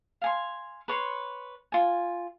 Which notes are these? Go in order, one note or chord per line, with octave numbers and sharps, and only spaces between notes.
F5 G#5 C6
B4 C#5 C6
F4 G#5